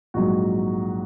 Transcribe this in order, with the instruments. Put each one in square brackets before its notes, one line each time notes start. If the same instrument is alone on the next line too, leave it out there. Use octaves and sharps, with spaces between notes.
[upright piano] A#1 G#2 F#3 F#4